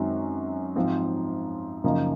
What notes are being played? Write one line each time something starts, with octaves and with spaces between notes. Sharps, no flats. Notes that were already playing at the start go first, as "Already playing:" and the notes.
Already playing: F#2 D#3 G#3 C4 F#4
G#2 F3 C4 F4
F#2 C#3 F3 A#3 D#4